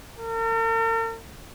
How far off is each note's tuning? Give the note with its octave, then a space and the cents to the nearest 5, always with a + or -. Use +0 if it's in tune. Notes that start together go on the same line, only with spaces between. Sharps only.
A#4 -45